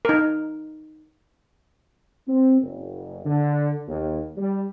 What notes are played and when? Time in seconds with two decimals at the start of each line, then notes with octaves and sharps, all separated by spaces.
0.05 D#4 A#4
2.28 C4
2.62 F#1
3.25 D3
3.88 D#2
4.37 G3